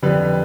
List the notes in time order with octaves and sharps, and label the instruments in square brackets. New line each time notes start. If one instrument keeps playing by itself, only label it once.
[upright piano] F2 D3 G3 B4